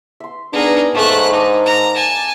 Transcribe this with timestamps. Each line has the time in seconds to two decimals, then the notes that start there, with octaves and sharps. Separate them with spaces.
0.20 E5 C6
0.53 B3 D4 D#4 G#4 A#4
0.95 G#2 A3 A#3 C#5 G#5 F#6
1.33 D4 D#4
1.66 A#5
1.95 G#5 A5